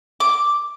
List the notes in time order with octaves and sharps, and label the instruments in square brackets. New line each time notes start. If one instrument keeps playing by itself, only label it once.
[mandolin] D6